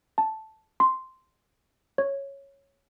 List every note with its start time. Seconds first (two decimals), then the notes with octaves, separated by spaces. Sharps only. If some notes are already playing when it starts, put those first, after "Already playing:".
0.18 A5
0.80 C6
1.98 C#5